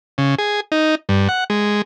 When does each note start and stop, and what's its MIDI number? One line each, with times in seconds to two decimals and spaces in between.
0.18 0.35 49
0.38 0.60 68
0.72 0.95 63
1.09 1.28 43
1.29 1.44 78
1.50 1.82 56